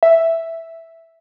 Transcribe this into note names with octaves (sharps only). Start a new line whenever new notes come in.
E5